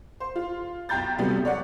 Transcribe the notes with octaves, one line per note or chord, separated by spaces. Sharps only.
C5
F4
B1 G5 A#5 G6 A6
C3 F#3 G3 A3 B3
C#5 D5 F#5